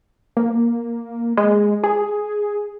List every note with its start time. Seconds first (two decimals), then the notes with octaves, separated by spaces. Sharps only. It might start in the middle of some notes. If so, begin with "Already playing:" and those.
0.37 A#3
1.37 G#3
1.84 G#4